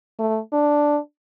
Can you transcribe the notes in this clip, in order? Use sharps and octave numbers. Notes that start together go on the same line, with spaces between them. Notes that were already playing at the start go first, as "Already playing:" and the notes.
A3
D4